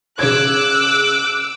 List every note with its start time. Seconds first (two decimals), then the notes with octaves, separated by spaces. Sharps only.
0.19 C#3 C#5 D6 E6 F#6 G#6